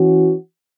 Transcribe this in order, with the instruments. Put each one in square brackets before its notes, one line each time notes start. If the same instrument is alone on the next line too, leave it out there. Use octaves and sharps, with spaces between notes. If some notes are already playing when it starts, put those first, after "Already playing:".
Already playing: [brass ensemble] E3 C#4 F#4